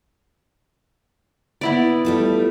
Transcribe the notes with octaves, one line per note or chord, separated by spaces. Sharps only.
B3 E4 D5
G3 A3 F4